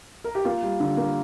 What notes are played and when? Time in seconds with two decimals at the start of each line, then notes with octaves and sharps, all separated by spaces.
0.24 A#4
0.35 G4
0.45 A#3 F4
0.63 G3
0.80 D3
0.97 A#3